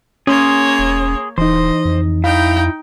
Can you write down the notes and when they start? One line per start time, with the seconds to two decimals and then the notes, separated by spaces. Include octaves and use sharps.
0.27 A#3 C#4 G#4 C#5 C6
0.79 E1
1.38 D#1 E3 D#4 C5 D#5
1.85 F2
2.24 D#4 E4 F5 G5